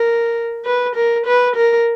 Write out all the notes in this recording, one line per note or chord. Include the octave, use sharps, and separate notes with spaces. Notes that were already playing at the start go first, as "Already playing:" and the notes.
Already playing: A#4
B4
A#4
B4
A#4